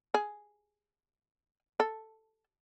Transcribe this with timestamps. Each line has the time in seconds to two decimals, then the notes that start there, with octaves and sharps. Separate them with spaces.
0.14 G#4
1.80 A4